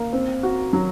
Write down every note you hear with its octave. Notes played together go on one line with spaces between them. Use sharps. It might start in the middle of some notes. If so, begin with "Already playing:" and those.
Already playing: A#3
C4
F#4
F#3